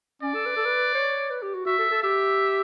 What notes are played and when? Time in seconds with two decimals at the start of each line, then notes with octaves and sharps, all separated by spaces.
0.22 C#4 D5
0.34 A4
0.46 B4
0.56 A4
0.65 B4
0.94 C#5
1.30 B4
1.42 G4
1.54 F#4
1.66 F#4 E5
1.78 A4
1.91 A4
2.03 G4 E5